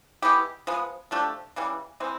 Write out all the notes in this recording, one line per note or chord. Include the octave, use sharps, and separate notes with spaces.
G#3 B3 E4 G4
F3 G#3 B3
F3 A3 D4 G4
C#3 E3 G3
E3 G#3 C4